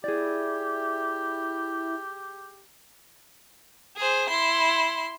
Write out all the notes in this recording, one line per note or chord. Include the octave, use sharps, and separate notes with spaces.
E4 G4 G#4 D5
G#4 C5
E4 C6